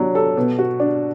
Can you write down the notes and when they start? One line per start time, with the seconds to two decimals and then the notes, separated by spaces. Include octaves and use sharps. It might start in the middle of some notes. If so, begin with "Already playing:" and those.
Already playing: F#3 D4
0.15 A4
0.37 B2
0.59 F#4
0.80 D4